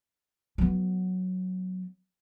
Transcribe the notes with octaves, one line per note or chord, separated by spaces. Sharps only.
F#3 B3